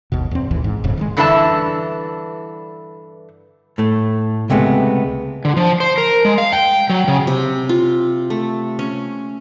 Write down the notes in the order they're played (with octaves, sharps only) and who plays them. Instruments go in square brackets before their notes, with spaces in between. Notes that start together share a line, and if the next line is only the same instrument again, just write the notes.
[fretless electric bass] G1 D#2 B2
E2 C4
A1 D#2 G#2 E3
G#2
D1 F2 A2 C#3
D#3 F3 G#3
[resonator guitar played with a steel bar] G2 D3 E3 E4 G#4 A5
[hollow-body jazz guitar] A2 A3
C#2 C3 G#3 A3 B3
[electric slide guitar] D3
F3
C5
A#4
G#3
F5
G5
F#3
C#3
[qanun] C3
F4
A3
C#4